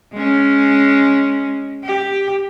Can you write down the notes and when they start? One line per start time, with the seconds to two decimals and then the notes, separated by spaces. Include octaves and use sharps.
0.13 G#3 C#4
1.83 G4